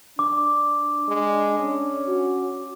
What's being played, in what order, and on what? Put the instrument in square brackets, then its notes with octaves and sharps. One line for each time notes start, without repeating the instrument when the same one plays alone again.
[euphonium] D4 [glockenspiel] D6
[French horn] G#3
C#4
[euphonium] F#4